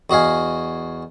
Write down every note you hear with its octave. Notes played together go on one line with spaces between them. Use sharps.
E2 F#4 D#5 F5 G#5